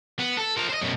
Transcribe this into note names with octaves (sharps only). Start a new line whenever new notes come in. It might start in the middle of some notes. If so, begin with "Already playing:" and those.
B3
A4
F3 A#4
C5 D#5
F#2 B2